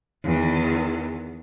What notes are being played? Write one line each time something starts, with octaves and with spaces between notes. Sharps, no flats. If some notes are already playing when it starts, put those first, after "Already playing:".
E2 D#3